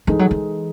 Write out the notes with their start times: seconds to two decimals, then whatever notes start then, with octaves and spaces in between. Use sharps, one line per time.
0.07 E3 G#3 D#4 A4
0.19 F#3
0.31 E3